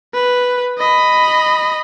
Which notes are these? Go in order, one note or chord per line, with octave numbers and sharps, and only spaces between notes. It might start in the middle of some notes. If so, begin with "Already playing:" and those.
B4
D#5 B5